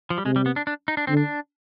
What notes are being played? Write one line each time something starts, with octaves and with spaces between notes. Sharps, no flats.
F3
G3
C3 G#3
G3
B3
D4
D4
D#4
D4
D3 C4
D4